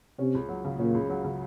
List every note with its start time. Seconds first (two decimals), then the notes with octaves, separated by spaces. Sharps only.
0.19 C3 C#4
0.35 C#2
0.49 F#3
0.65 C#3
0.79 A#2 C#4
0.94 C#2
1.10 F#3
1.24 C#3